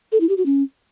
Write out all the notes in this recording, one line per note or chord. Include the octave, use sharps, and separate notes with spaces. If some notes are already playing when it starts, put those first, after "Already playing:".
A4
E4
G4
F#4
C#4